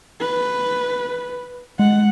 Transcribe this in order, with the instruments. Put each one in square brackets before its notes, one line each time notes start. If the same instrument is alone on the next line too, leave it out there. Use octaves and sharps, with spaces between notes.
[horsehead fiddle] B4
[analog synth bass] G#3 [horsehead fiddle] F#5